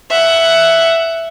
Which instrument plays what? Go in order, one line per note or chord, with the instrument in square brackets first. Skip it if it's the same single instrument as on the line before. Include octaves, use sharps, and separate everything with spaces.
[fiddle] E5 F#5